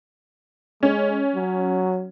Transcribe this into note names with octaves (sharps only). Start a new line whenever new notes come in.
G#3 C#4
F#3